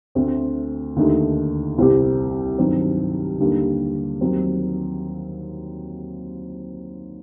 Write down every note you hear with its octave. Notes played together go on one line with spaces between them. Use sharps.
D2 D3 A3 C4
D#2 D3 A3 D#4
C2 C3 G3 C4 G4
G2 D#3 F#3 C4
D#2 D3 G3 A#3 D#4
D#2 D#3 F#3 C4